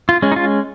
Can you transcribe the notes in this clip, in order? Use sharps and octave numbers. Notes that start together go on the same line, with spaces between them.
F4
G#3 C#4
D#4
F4